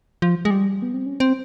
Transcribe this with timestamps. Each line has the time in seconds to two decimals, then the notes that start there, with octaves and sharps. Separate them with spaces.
0.22 F3
0.45 G#3
0.51 G3
0.82 B3
0.94 C4
1.06 C#4
1.20 C4